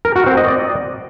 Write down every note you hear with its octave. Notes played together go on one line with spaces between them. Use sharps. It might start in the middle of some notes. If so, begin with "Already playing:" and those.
A#4
F#4
C4
D#5
D5